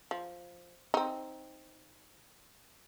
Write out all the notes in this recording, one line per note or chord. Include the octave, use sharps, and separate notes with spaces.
F3
C4 D#4